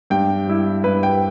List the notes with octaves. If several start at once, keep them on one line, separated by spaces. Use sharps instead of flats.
G2 G5
G3 E4
G2 B4
G5